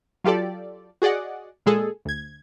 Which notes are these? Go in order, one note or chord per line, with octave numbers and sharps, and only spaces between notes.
F#3 F4 G4 A4 D5
F#4 G#4 D5 D#5 F#5
A#2 G#3 G#4 A4
D2 G#6